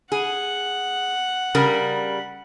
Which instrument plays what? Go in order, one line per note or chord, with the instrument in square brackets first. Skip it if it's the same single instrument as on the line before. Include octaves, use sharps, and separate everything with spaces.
[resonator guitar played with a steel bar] G#4 [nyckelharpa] F#5
[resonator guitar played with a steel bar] C#3 G3 A#4